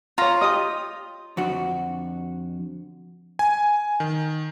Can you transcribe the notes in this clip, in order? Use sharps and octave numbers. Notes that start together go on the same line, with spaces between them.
F4 C#5 A#5
G4 D#5 D#6
F2 D3 F#4
G#5
D#3